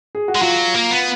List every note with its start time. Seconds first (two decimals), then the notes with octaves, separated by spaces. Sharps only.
0.15 G#4
0.28 F#4
0.35 G#3
0.41 F#3 F4
0.74 A#3
0.91 B3